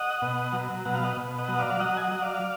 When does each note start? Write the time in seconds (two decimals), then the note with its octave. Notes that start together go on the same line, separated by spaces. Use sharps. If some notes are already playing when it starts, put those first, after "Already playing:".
Already playing: D#5 F#5
0.22 B2
0.53 F#3
0.85 B2 F#5
0.95 F5
1.04 D#5 F#5
1.17 B2
1.38 D#5 F#5
1.48 F#3
1.59 D5 F5
1.80 F#3 D#5 F#5
1.97 G#5
2.01 D#5 F#5
2.12 F#3
2.22 D5 F5